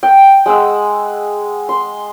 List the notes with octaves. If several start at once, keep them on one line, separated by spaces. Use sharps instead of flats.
G5
G#3 F#5 E6
C6